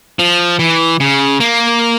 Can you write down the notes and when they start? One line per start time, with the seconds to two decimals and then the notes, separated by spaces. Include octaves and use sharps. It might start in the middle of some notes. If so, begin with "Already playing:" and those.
0.19 F3
0.59 E3
1.00 C#3
1.40 A#3